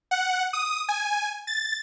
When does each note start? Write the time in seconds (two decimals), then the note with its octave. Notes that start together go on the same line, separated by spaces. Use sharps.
0.11 F#5
0.53 D#6
0.89 G#5
1.47 A6